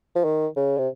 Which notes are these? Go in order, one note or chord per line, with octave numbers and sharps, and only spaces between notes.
F3
D#3
C#3
C3